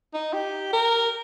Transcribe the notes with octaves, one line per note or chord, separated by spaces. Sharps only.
D#4
G4
A#4